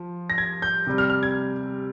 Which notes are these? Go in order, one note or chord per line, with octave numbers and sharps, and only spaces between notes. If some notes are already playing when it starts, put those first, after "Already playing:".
Already playing: F3
A#6
G#6
G6
C3 G3
F6
F6
G#6